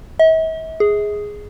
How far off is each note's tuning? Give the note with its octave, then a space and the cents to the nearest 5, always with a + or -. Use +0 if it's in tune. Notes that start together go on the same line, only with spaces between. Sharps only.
E5 -45
G#4 +0